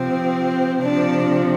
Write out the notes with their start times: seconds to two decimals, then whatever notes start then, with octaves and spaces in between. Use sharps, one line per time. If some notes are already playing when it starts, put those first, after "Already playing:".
Already playing: C3 F3 C4
0.83 C3 F3 D4